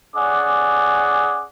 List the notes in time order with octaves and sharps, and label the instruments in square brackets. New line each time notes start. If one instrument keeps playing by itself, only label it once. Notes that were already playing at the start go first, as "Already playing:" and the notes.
[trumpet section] C#4 G#4 D5 F#5 D6